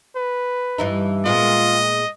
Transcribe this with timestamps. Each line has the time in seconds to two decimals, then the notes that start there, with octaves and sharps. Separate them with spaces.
0.16 B4
0.78 G2 E3 D#4
1.26 A#2 G#3 B3 F4 D#5